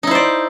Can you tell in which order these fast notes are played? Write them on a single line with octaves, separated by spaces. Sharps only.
D#4 E4 C5 D5